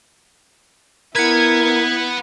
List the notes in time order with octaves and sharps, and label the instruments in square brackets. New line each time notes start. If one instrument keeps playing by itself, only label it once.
[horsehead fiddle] B3 E4 [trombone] A#4 [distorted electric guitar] B4 F#5 [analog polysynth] G#6